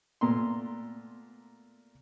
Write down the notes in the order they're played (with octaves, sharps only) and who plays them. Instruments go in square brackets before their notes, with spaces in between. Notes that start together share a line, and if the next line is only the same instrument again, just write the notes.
[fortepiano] A#2 A3 B3 A#5 C6